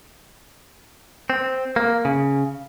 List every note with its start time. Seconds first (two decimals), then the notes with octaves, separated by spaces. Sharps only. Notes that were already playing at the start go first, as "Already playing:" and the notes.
1.30 C4
1.76 A#3
2.05 C#3